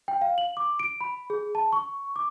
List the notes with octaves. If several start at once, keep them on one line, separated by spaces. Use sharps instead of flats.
G5
F5
F#7
D6
D7
B5
G#4
A5
C#6
D6